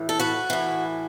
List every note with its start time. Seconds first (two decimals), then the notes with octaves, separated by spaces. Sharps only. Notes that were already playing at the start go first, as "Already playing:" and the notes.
Already playing: A2 E3
0.09 A4
0.20 F#4 B4
0.50 A2 E3